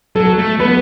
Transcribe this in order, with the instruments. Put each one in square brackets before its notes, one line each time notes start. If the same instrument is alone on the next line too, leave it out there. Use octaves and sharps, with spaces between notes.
[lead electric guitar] F#3 [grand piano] A4
[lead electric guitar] A3
[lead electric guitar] B3 [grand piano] B4